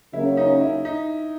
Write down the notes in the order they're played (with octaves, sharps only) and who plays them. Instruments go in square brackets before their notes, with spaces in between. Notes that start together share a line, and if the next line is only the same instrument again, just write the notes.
[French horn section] C#3 F#3 A#3 C#4 [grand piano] E4
[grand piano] D#4
E4
D#4